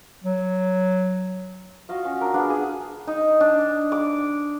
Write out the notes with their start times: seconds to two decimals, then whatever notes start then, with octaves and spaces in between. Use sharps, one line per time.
0.24 F#3
1.89 F4 F#4 D#5 F5
2.05 C#4
2.21 D4 A#4
2.34 B3 D4 F4 G#4
2.50 G#4
3.07 D#4
3.40 D4
3.92 D6